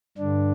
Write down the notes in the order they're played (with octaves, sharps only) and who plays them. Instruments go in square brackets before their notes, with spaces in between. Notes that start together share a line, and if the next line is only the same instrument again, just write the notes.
[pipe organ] G2 D3 D4